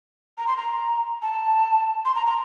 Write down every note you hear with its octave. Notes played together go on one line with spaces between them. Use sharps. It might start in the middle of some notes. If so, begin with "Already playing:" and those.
A#5
C6
A#5
A5
C6
A#5
A#5